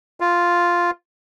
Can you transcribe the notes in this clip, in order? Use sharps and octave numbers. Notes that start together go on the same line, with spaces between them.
F4